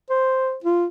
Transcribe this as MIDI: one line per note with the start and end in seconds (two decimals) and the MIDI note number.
0.10 0.56 72
0.64 0.86 65